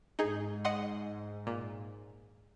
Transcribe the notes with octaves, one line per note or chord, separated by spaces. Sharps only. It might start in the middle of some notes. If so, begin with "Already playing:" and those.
G#2 D#4 G#4
D#5 F#5 C6
A#2